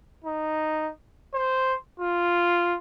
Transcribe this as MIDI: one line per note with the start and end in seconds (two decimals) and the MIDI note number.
0.24 0.90 63
1.34 1.74 72
2.00 2.77 65